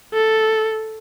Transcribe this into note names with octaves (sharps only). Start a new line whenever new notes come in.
A4